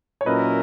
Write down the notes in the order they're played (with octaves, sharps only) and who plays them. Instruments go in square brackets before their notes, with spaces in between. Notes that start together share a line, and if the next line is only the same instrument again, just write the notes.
[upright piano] C#5
[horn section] A#2 F#3 C#4 E4 A#4 [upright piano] B4 D#5